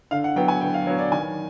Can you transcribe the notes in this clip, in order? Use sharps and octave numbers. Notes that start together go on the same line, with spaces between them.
D3 F5
F#5
F#3 B3 G5
G#5
D3 G5
F5
F#3 B3 C#5
D5
D#3 G#5